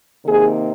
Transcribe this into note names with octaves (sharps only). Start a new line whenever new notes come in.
C3 D#3 A#3 D#4 G#4